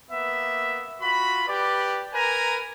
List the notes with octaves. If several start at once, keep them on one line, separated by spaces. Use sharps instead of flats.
A#3 B3 E5
F4 F#4 B5
G4 B4 D5
A#4 B4 G#5 A#5